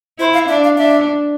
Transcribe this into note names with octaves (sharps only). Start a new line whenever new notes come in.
E4 C5
F5
D4 E5
F5
D4 E5